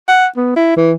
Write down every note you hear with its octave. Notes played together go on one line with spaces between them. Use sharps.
F#5
B3
E4
E3